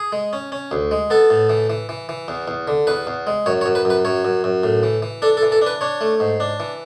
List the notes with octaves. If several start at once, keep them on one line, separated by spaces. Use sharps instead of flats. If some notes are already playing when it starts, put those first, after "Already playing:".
Already playing: G#4
G#3
C#4
C#4
D2
G#3
B3 A4
A2
E3
E3
E3
E3
E2
E2
D3
E2 B4
E2
G#3
F#2 C#5
C#5
F#2
B4
F#2 B4
F#2 C#5
F#2
F#2
A2
E3
E3
D4 A4
A4
E3
A4
D4 B4
D4 C#5
A3
G#2
D4
E3